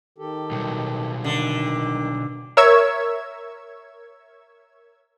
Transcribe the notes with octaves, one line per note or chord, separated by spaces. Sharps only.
D#3 G4 A4
B2 F#3 G3
D3 D#3
A#4 C#5 E5 C#6 E6 G#6